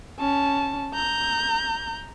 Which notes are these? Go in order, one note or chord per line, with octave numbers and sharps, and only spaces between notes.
C#4 A5
A#5 G6